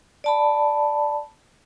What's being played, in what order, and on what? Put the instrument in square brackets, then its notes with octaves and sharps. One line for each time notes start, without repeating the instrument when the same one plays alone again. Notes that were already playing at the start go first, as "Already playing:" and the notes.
[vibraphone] D5 A5 B5